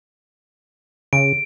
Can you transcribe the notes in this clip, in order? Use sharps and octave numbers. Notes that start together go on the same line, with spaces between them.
C#3 D7